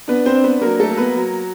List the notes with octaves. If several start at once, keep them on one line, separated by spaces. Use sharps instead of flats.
B3 D4 B4
C4 C5
D4
B3 B4
F#3 A#3 A#4
A3 A4
A#3
B3 B4
F#3